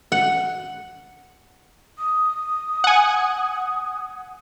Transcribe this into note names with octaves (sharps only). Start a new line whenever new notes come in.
F#5
D#6
F#5 G#5